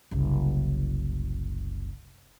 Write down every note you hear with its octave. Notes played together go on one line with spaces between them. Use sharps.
F#1 C2